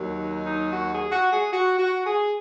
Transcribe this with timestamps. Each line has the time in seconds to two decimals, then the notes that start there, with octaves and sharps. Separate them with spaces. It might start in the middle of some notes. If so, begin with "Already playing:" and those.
Already playing: D#2 D#3 F#3
0.18 D#4
0.45 D#4
0.72 F#4
0.92 G#4
1.12 F#4
1.33 G#4
1.52 F#4
1.78 F#4
2.06 G#4